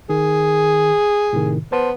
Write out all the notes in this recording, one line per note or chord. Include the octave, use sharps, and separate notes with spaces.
D#3 G#4
A2 C3 D#3
B3 C5 A5 C6